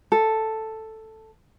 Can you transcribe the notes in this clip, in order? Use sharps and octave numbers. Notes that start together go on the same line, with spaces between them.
A4